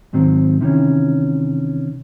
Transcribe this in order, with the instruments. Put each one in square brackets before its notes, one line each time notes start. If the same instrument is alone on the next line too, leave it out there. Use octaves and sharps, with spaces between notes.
[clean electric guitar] G#2 D#3 F#3 C4
C3 D#3 E3 C#4